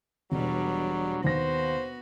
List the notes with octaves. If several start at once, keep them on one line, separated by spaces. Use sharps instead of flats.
E1 B2 F#3 G3 D4
D#2 B3 F#4 C5 A#6